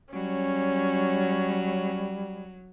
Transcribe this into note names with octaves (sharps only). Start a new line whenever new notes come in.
F#3 G3 C#4